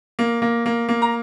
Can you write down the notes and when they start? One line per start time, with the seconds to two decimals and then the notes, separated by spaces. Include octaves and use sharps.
0.19 A#3
0.42 A#3
0.66 A#3
0.89 A#3
1.02 A#5